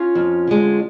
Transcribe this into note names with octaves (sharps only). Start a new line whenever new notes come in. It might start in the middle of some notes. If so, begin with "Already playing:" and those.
Already playing: C#4 F4
F2
D3 G#3